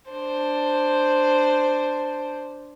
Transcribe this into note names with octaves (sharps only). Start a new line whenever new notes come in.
D4 C5